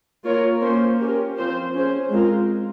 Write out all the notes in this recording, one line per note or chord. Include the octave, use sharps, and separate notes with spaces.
A#3 F4 A#4 C#5
A#3 C#4 F4 C5
C#4 G4 A#4
F3 C4 F4 C5
C#4 G#4 C5
G#3 C4 F4 A#4